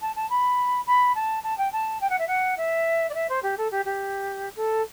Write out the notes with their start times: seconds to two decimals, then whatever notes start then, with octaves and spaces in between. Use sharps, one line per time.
0.01 A5
0.15 A5
0.30 B5
0.86 B5
1.15 A5
1.43 A5
1.57 G5
1.72 A5
2.01 G5
2.09 F#5
2.18 E5
2.27 F#5
2.57 E5
3.09 D5
3.14 E5
3.29 C5
3.42 G4
3.57 A4
3.71 G4
3.85 G4
4.56 A4